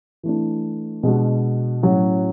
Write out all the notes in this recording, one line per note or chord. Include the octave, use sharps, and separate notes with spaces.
E3 A3 D4
B2 G#3 D4 F#4
A2 F#3 C#4 F#4